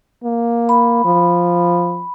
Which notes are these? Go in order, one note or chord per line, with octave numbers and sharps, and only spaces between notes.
A#3
B5
F3